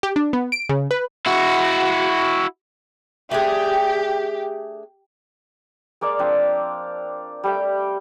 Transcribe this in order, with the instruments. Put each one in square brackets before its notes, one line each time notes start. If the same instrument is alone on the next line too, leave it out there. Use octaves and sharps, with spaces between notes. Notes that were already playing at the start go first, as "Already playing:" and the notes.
[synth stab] G4
D4
B3
D7
C#3
B4
[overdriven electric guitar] E4 F#4
[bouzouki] A3 D4 G#4 [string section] G4
[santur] G#3 A#3 D5 F5
F3 C4 D4
G3 A3 G5